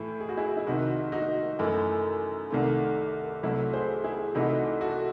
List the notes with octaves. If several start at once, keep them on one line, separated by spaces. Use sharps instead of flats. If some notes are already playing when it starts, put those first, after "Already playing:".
Already playing: A2 E3 A3 E4
G#4
F#4
E4 G#4
E4
C2 C3 D#3 D#4 F#4
D#4 F#4
F#2 E3 A3
C2 C3 D#3 A3
C2 C3 F#3 A3 E4
G#4 C5
E4 G#4
C2 C3 E3 A3 D#4 F#4
F#4 A4